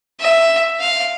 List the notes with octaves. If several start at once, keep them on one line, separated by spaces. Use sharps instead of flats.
E5
F5